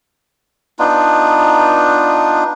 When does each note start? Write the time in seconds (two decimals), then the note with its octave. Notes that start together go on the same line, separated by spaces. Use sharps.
0.79 B3 D4 D#4 F4